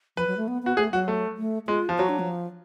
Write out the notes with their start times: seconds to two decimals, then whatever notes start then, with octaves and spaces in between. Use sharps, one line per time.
0.17 F3 B4
0.27 F#3
0.37 A3
0.48 B3
0.63 B3 F#4
0.77 A3 G#4
0.92 F#3 F#4
1.08 A3
1.37 A3
1.68 G#3 F4
1.89 F3
1.98 F#3 F#4
2.09 D4
2.19 F3